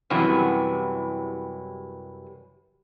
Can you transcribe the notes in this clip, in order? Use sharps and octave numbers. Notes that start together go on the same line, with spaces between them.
F#2 C3 E3 F#3 G3